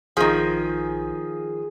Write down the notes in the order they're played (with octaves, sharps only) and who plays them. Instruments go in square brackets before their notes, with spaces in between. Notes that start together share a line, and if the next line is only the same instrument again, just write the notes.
[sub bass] A#1 [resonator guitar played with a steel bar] D#3 F3 [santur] G#4